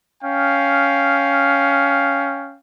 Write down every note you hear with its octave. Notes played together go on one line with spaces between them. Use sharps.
C#4 F5 G5